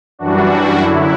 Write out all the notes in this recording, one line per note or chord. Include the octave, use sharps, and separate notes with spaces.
F#2 E3 G3 D4 F#4
F#2 D3 F#3 E4